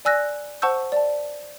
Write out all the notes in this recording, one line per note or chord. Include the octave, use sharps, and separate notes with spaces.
D5 G#5 E6 F#6 A#6
C5 F#5 A5 C#6 E6 G6
D5 A5